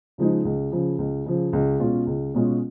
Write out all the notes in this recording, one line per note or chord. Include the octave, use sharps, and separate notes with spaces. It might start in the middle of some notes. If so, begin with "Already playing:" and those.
C#3 F3 G#3 D#4
C#2
C#3 F3
C#2
C#3 F3
C#2
B2 G#3 C#4 F4
C#2
B2 G#3 C#4 F4